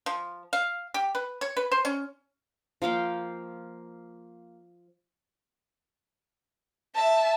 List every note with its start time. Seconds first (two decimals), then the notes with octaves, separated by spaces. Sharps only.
0.06 F3
0.53 F5
0.94 G4
1.15 B4
1.41 C#5
1.57 B4
1.72 C5
1.85 C#4
2.82 F3 A#3 F5 G5
6.96 E5 A5